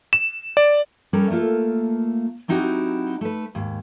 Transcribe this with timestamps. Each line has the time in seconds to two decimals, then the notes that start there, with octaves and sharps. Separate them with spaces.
0.13 E7
0.57 D5
1.13 G3 C#4 A4 A#4
1.30 A3 A#3 F4 A4
2.48 F#3 C4 D#4 E4 F#4 G4
3.21 A3 B4
3.55 D#2 G#2